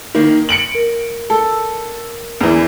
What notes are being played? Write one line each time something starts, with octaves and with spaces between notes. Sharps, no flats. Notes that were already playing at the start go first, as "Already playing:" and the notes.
D#3 A#3
C#7 D7 F#7
A#4
A4
E2 E3